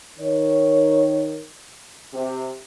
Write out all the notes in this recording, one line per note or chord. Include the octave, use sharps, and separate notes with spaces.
D#3 C#5
C3 G4